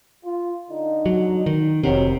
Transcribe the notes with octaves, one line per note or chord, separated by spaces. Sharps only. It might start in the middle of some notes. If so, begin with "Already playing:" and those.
F4
D3 D#4
F#3
D#3
F1 C3 D#3 F#3